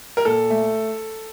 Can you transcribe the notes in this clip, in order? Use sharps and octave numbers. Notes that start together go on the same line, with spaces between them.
A#4
A#2 A4
A3